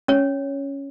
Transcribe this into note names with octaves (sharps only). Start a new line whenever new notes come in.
C#4 C#5